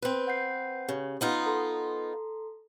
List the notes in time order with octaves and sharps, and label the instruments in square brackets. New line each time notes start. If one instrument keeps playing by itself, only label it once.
[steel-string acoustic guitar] C4 B4
[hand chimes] F#5 G6 C7
[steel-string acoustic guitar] C#3 [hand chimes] C#4 G4
[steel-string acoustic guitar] B3 D#4 F4
[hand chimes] A4 A#5 C6